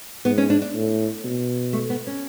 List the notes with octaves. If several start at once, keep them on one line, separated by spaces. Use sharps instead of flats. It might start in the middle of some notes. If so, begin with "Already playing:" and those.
G#2 B3
C#4
D4
D4
A2
B2
A3
B3
C#4